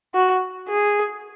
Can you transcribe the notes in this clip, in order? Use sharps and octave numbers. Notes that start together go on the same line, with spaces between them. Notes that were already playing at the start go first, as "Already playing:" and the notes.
F#4
G#4